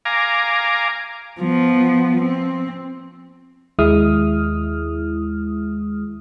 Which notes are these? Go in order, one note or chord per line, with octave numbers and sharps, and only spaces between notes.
F5 G#5 A#5 D6
F3 B3
C4
D#2 G#3 E4 D#6 F6